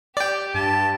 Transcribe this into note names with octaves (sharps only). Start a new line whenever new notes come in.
G4 D5 G5
G2 A5